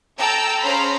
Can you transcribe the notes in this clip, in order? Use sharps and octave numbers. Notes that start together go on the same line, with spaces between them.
A4 G5 A5 A#5 E6
C#4 G#4 C5 F5 A#5 B5